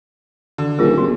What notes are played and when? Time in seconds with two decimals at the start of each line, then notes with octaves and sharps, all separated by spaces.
0.58 D3
0.79 D#1 F4 G#4 A#4
0.98 G1 F#4